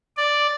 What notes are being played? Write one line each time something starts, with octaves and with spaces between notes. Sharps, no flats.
D5